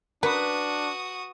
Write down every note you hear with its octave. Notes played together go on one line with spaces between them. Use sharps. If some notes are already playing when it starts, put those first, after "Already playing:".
D4 F#4 A#4 B4 D#6